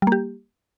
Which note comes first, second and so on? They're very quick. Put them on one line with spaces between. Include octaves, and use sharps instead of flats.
G3 A#3 G4